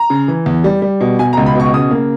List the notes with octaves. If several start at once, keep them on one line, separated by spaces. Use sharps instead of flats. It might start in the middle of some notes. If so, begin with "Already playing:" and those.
Already playing: A#5
C#3
E3
E2
G3
G3
B2
B2 G#5
A#5
C#2
B5
B2 C#6
C#3 D#6
A#3